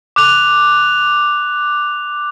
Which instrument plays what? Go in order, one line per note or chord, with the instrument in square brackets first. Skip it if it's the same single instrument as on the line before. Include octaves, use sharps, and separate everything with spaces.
[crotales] D6 F#6 F7